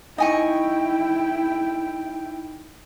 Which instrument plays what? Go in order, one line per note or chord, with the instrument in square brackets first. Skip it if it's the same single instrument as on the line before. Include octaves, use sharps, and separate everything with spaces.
[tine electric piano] D#4 [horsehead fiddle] E4 G5 [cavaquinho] D#5 G#5 C#6